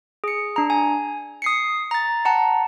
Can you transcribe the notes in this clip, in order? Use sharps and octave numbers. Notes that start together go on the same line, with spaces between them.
G#4 C#7
D4 A#5
G#5
D#6 C7 C#7
A#5 A6
F#5 A5 A#5